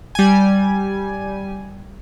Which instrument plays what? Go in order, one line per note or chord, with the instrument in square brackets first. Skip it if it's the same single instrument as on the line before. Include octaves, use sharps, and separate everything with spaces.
[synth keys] G3 G#5